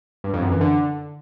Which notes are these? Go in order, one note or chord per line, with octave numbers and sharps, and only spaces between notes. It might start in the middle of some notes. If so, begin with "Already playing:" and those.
G2
F2
F#2
E3
D3